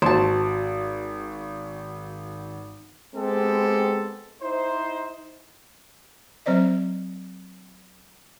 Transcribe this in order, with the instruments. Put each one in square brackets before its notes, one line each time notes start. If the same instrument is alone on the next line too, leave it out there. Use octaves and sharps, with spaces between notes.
[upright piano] G#1 F#4 [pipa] C5 A5
[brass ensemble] G#3 B3 C4 G4 A4
D#4 E4 C5
[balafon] F#3 C4 C5 D5 D#5